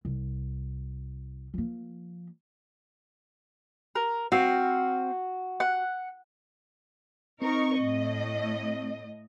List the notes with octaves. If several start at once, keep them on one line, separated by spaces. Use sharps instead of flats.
C2
F3 A#3
A#4
C4 F#4 F5
F#5
C4 D#4 A#4 C#6
A2 D#5